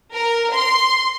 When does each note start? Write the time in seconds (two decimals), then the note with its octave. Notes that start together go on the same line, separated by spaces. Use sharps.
0.13 A#4
0.53 C6